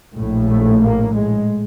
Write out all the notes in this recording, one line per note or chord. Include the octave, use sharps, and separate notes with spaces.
A#1 A2
A3
A#3
G#3